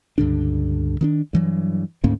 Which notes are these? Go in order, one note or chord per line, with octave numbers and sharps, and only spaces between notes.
C#2 G2 D3 D4
D#3 C#4 D4
G2 E3 F#3
D2 G#2 A#3 C#4